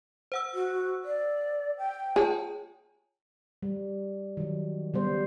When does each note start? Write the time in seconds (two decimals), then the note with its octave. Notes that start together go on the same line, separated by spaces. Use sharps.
0.32 C5 F#5 E6
0.54 F#4
1.05 D5
1.78 G5
2.16 F4 G#4 C#5 A5
3.62 G3
4.37 D#3 F#3
4.94 C#3 G3 B3 C5